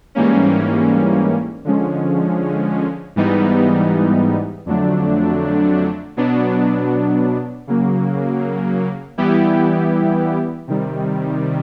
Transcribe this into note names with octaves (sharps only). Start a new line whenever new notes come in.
G#2 E3 G3 A#3 C#4
D3 F3 G#3 C#4
G#2 E3 G3 B3 D#4
F2 D3 F#3 A3 D4
B2 F#3 B3 D4
C#3 F#3 A#3
E3 G3 B3 E4 G4
C3 D#3 G3